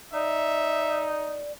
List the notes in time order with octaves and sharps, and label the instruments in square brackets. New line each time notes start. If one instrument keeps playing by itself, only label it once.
[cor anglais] D#4 [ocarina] D5 [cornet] E5